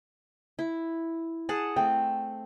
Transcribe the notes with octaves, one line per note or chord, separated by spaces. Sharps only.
E4
G#4 F#5 A5
A3 C4 G5